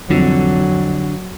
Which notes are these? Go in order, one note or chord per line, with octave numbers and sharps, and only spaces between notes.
C2 F2 D3 F#3